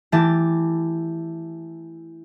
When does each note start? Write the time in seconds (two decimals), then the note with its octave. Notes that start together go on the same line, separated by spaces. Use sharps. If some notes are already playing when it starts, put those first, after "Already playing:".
0.12 E3 A3 G4 A5